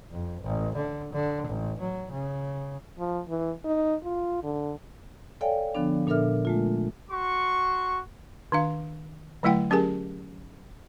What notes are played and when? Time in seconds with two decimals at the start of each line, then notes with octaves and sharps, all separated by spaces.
0.11 F2
0.42 A1
0.76 D3
1.13 D3
1.48 A1
1.80 F#3
2.12 C#3
2.99 F3
3.29 E3
3.65 D#4
4.04 F4
4.43 D3
5.41 A4 C#5 D5 F5 G5 G#5
5.75 D3 F3 B3 D4
6.07 A#2 D4 A4 A#4 E5 F6
6.45 G#3 A3 F4
7.11 F#4 C6 C#6
8.52 D#3 D4 F5
9.43 D3 F#3 A3 E4 F#5 G5
9.70 F#3 C#4 G4 G#4 A#4 G#5